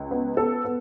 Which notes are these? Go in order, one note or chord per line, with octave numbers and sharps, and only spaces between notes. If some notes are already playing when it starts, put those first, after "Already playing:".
Already playing: C#2
B3
B3 A4
B3